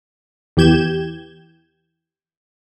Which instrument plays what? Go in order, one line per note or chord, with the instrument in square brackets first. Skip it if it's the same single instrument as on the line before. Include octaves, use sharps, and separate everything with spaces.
[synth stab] E2 E3 G4 G6 G#6 E7